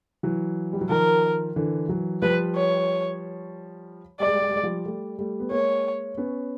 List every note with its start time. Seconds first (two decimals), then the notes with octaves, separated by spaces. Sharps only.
0.23 E3 F#3
0.73 G3
0.81 F#3
0.89 D#3 F3 A#4
1.56 D3 E3
1.88 E3 F#3
2.22 F3 G3 B4
2.55 C#5
4.20 G3 D5
4.26 G#3
4.34 G3
4.42 G#3
4.49 G3
4.56 G#3
4.63 F3 G3
4.86 G3 A3
5.19 G3 A3
5.40 B3
5.51 G#3 A#3 C#5
6.17 B3 C#4